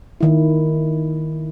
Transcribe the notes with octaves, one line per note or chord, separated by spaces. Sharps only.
D#3 E4